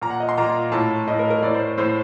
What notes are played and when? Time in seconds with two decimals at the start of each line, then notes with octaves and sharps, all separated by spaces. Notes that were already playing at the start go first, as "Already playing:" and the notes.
0.02 A#2 A#5
0.10 F#5
0.20 D#5
0.29 C6
0.38 A#2 A#5
0.72 A2 A5
1.07 A2 D#5
1.19 A#4
1.30 A#4
1.42 A2 D5
1.54 C5
1.78 A2 C5